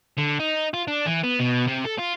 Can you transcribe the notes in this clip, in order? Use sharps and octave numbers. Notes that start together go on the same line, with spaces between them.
D3
D#4
F4
D4
E3
B3
B2
C3
A4
F4